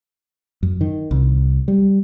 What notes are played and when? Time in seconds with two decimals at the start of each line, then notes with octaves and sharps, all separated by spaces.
0.63 F#2
0.81 D#3
1.11 C2
1.68 G3